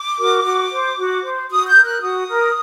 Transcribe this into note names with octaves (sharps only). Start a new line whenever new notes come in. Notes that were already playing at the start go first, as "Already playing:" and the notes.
Already playing: D6
F#4 A#4
F#4
C5
F#4
C5
F#4 D#6
G6
A#4
F#6
F#4 D#6
A#4